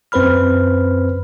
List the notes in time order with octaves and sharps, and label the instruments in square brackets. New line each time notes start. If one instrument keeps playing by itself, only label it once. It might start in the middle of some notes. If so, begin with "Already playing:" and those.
[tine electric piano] F#2 C4 B4 C5 B5 F6